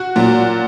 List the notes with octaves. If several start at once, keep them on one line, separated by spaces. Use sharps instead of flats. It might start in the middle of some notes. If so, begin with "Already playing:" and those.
Already playing: F#4
A#2 F#3